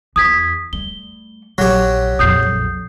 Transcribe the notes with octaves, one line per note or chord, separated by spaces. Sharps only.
E2 D#6 G#6 B6
G3 A3 G7
A#1 F#3 G4
A#1 F2 D#6 G6 C7